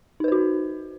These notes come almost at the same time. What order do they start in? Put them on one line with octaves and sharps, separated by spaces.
D#4 B4 C5 F#4